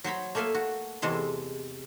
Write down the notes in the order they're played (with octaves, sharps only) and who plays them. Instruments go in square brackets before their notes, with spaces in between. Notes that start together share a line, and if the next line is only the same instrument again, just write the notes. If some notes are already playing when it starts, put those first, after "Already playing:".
[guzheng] F#3 C5 C#5 B5
A3 A#3 A4 E5 F5 G#5
F#4
E2 C3 G#3 A4 C6